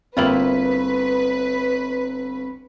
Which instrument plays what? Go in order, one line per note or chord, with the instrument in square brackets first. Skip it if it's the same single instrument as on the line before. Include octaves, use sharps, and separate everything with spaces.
[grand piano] G1 G5 F#7 [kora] A#3 E4 F4 [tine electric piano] C4 [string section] B4